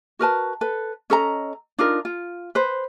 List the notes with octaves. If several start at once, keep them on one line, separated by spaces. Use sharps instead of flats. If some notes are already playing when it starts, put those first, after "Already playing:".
F#4 A#4 B4 A5
A4 B4
C#4 A4 D#5 A#5
D4 D#4 F4 A#4
F4
B4 C5